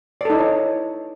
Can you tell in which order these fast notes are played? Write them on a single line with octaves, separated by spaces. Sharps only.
D5 A4 D#4 E4 C#5